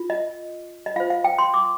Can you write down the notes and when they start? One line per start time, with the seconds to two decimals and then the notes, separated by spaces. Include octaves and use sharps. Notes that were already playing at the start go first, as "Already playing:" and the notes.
Already playing: F4
0.10 D#5
0.86 D#5
0.96 F4 C5 F5
1.10 F5
1.24 G5
1.38 C6
1.54 D6